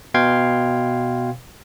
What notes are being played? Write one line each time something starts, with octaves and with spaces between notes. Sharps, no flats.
B2 F5 G5 C6 G#6